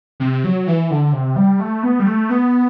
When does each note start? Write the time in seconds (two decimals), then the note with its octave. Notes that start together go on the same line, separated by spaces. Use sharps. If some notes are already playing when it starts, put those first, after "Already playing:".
0.20 C3
0.44 F#3
0.67 E3
0.91 D3
1.13 C3
1.36 G3
1.60 A3
1.83 B3
1.99 G3
2.06 A3
2.30 B3